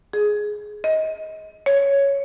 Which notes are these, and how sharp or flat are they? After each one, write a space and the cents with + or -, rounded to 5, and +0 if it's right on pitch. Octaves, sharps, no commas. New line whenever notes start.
G#4 +10
D#5 +25
C#5 +5